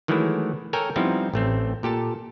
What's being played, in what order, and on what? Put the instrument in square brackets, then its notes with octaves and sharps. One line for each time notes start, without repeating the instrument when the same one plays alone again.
[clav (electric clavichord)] D#3 E3 F#3 G#3 A3 E4
A4 A#4 C#5 G5 G#5 A#5
F3 G3 B3 C4 D#4 E4
A1 A3 C4
A#2 G4 A4 A5